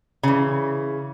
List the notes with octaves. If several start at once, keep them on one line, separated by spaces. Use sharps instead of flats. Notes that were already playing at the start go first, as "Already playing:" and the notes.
C#3 E3